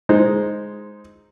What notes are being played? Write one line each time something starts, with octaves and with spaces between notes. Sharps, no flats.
G#3 D#4 C5